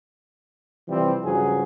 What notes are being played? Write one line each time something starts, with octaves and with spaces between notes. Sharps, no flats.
C3 E3 F3 G3 C4
G2 C#3 F3 F#3 G#4